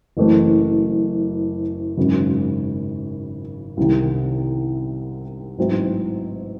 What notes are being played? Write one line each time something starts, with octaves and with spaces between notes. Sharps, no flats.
F#1 F#2 E3 A3 C4
G#1 F#2 C#3
C2 C3 D#3
A1 G#2 F#3 C4 E4